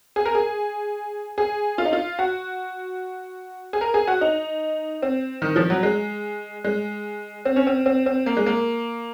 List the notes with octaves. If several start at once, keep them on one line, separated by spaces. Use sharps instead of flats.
G#4
A#4
G#4
G#4
F4
D#4
F4
F#4
G#4
A#4
G#4
F#4
D#4
C4
D#3
F3
F#3
G#3
G#3
C4
C#4
C4
C4
C4
A#3
G#3
A#3